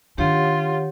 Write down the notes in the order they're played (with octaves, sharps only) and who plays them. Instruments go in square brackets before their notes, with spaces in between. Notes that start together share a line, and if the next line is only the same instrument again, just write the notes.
[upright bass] D#3 D4 [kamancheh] F4 [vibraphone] G4 C#5 F#5